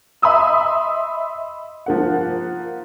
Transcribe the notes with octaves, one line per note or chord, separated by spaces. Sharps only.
D#5 E5 B5 C6 D#6 E6
F3 A#3 F#5